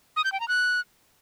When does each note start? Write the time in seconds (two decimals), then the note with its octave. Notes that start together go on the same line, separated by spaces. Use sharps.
0.16 D#6
0.24 G6
0.32 G5
0.40 A#5
0.48 F#6